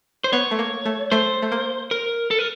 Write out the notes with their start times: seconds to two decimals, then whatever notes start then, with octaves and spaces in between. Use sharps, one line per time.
0.24 C5
0.33 B3 C#5
0.51 A3
0.59 A#3
0.86 A3
1.11 A3 C5
1.42 A3
1.52 A#3
1.91 A#4
2.31 A4
2.39 A#4